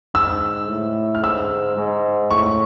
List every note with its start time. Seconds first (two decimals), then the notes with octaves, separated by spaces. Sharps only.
0.15 G#2 E6
0.69 A2
1.15 F6
1.23 G#2 E6
1.77 G#2
2.31 A2 C#6